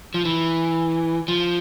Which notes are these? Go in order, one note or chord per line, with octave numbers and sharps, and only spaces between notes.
F3
E3
F3